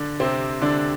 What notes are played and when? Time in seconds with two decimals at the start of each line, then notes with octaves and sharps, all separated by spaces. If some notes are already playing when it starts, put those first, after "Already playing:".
Already playing: D3 D4
0.20 C3 C4
0.61 D3 D4